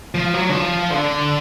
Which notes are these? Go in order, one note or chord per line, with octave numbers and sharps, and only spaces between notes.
F3
F#3
D3
F3
D3